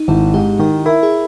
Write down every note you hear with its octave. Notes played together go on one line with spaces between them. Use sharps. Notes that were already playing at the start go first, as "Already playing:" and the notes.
Already playing: D#4
G#1 E4
G#2 G4
D#3 A#4
E4 A#4
G#4